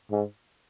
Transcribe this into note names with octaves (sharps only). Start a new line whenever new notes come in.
G#2